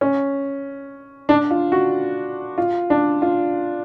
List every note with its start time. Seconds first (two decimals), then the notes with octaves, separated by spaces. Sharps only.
0.01 C#4
1.29 D4
1.51 F4
1.72 F#4
2.58 F4
2.90 D4
3.22 F4